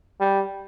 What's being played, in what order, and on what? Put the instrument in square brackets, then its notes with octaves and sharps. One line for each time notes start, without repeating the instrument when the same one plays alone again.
[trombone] G3